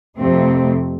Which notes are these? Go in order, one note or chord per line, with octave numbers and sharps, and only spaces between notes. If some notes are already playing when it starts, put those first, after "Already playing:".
F2 C3 A3 C4